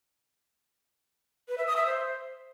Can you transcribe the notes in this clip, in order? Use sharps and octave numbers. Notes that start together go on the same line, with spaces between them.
B4
E5
D#6
E5
C5